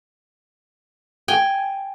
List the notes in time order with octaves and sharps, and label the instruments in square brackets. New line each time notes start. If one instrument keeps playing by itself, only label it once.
[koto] G5 G#5